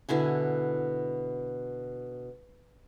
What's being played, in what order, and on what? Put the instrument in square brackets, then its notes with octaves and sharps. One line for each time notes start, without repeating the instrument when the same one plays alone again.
[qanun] B2 D3 E4 G#5